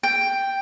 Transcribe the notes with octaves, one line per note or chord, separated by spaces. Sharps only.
G5